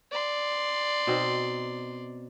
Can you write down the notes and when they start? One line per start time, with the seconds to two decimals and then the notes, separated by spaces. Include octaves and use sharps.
0.12 D5 C6
1.07 B2 C4 D#4